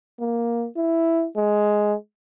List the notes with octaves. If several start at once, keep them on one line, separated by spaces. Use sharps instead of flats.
A#3
E4
G#3